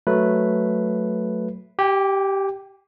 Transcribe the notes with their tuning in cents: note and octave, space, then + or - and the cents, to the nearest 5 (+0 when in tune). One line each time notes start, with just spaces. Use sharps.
F#3 +0 A3 +0 B4 +0
G4 -10 G5 +45